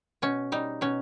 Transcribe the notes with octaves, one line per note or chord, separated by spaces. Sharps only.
B2 C#4
G3 D#4
B2 C#4